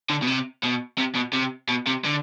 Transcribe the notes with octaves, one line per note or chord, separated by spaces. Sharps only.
D3
B2
C3
B2
C3
B2
C3
B2
C3
D3